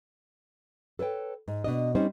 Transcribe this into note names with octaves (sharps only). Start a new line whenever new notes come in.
A4 B4 C#5 G5
G#2
B2 D4 D#5
G3 C4 C#4 D#4 C5